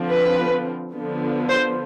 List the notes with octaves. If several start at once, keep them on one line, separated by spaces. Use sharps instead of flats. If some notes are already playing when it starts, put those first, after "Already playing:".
Already playing: D3 F3 C4
B4
D3 F3 B3
C5